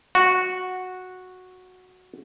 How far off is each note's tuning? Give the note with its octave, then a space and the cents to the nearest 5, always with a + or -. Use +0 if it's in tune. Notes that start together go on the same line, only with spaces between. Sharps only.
F#4 -10